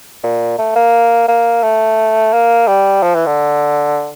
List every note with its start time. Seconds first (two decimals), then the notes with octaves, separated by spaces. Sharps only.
0.24 A#2
0.59 A3
0.76 A#3
1.28 A#3
1.63 A3
2.33 A#3
2.68 G3
3.03 F3
3.15 E3
3.26 D3